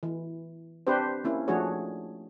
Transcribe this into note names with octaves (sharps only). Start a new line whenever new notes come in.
E3
C4 D4 G4 B4 C5
A#3 C#4 E4
F3 A3 D4 F#4 G#4 C#5